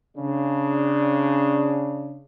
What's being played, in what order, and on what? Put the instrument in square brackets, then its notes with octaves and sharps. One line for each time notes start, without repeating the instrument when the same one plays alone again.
[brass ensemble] C#3 D4